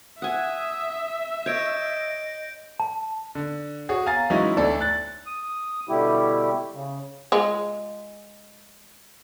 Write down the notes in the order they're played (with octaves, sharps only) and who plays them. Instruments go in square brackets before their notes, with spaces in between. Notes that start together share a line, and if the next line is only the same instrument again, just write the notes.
[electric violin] E5 [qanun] F#5 G#5 [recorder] D#6
[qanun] C#5 [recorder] D#5 [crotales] G6 D7
[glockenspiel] A5
[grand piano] D3
F#4 G#4 C#5
F5 G#5 A#5 A6
E3 F#3 G#3 C#4 D#4 E4
D2 E4 A4 D5
F#6 A6
[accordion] D#6
B2 D3 G3 A3 E4 G4
C#3
[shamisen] G#3 F4